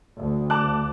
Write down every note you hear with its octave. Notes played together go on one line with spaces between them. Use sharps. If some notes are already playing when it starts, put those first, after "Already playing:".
D2
A5 D6 F#6